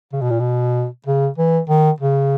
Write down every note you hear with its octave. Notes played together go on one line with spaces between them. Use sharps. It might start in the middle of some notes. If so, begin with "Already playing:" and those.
C#3
B2
A#2
B2
C#3
E3
D#3
C#3